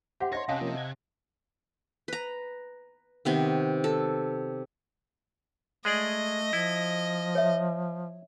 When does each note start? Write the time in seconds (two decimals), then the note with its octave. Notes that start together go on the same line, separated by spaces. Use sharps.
0.20 G4 C5 E5 F#5
0.33 D#4 C#5 D#5 C6 A#6
0.49 C3 C#4 D#5 F5 F#5 G#5 A5
0.61 F3 A#3 C#4
0.77 F#5 G#6
2.08 B4 A#5
3.25 C3 D#3 B3
3.84 A4
5.85 G#3 A3 G#4 D5 D#5
6.53 F3 E4
7.35 C#5 E5